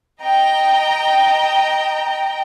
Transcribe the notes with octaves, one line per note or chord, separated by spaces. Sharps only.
D#5 G5 A#5